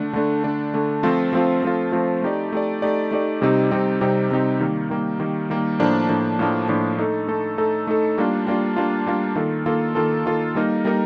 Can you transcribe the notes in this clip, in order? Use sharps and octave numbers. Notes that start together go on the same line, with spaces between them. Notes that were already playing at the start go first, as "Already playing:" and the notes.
Already playing: D3 A3 D4
D3 A3 D4
D3 A3 D4
D3 A3 D4
F3 A3 C4 F4
F3 A3 C4 F4
F3 A3 C4 F4
F3 A3 C4 F4
A3 D#4 G4 D5
A3 D#4 G4 D5
A3 D#4 G4 D5
A3 D#4 G4 D5
C3 G3 C4 D#4 G4
C3 G3 C4 D#4 G4
C3 G3 C4 D#4 G4
C3 G3 C4 D#4 G4
D#3 G3 A#3
D#3 G3 A#3
D#3 G3 A#3
D#3 G3 A#3
A2 F3 A#3 D4
A2 F3 A#3 D4
A2 F3 A#3 D4
A2 F3 A#3 D4
A3 D#4 A4
A3 D#4 A4
A3 D#4 A4
A3 D#4 A4
G3 A#3 D4 F4
G3 A#3 D4 F4
G3 A#3 D4 F4
G3 A#3 D4 F4
D#3 A#3 F4 A4
D#3 A#3 F4 A4
D#3 A#3 F4 A4
D#3 A#3 F4 A4
G3 A#3 D#4 A#4
G3 A#3 D#4 A#4